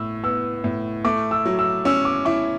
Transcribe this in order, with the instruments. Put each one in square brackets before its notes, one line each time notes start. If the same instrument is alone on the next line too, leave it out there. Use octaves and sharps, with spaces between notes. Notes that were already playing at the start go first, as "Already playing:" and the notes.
Already playing: [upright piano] A2 [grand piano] E6
[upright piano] B3 [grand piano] E6
[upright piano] A2
[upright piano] A3 [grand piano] D6
[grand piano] E6
[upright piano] F#3
[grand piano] E6
[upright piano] C#4 [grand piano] E6
[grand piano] D6
[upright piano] E4 [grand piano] D6